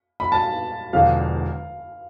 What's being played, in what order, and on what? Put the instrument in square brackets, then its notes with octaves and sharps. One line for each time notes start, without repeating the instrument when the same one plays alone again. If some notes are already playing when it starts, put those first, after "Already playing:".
[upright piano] B5
A5
[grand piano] E1 E2 D3 F3 [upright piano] F5